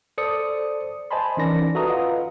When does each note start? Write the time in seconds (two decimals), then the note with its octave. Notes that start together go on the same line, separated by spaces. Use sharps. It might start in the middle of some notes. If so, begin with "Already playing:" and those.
0.18 A4 C5 D5 D#6 C#7
1.11 C5 D#5 G#5 A5 B5 C6
1.37 E3 C#4 D#4 A#4 D5 A#6
1.75 F#4 A4 B4 E5 A#5 D#6
1.87 F4 B4 D#5 F5 F#5